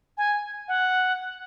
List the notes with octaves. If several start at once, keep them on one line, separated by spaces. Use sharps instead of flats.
G#5
F#5